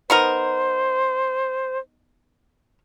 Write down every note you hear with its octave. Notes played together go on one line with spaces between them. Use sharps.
B3 D#4 A#4 C5